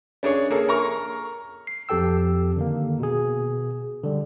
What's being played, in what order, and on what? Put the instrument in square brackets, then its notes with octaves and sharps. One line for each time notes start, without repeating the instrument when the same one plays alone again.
[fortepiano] C#4 D4 G#4 C#5
A#3 G#4 A4
A#4 A#5 C#6
[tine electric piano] C7
F2 F3 G4 A4 G5 E6
D3 D#3 A#3
B2 G#4
D3 G3